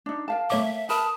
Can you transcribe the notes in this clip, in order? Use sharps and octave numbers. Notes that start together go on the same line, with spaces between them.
D4 D#4
A#4 F5 A5
A3 C#5 E5 D6
A#4 B4 A5 B5 D#6